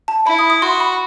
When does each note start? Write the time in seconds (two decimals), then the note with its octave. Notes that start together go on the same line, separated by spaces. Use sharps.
0.08 A5
0.27 E4 B5
0.39 D#6
0.50 D#6
0.62 F#4 C6
0.80 B5